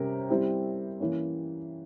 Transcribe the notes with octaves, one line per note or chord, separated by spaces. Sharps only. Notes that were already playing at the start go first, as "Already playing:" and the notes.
Already playing: C3 G3 C#4 G4 A#4
G3 C4 E4 G4
E3 A#3 C#4